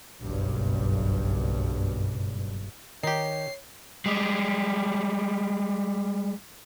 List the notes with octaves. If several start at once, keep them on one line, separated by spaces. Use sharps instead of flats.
F#1 B1 G2
D#3 D#4 G4 C#5 C7
G3 G#3